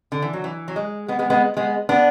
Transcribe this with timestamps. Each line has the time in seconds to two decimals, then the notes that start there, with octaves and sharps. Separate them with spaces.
0.12 D3
0.22 E3
0.33 F#3
0.44 E3
0.68 F#3
0.76 G#3
1.08 G#3 B3
1.19 G#3 B3
1.30 G#3 B3
1.57 G#3 B3
1.89 B3 D4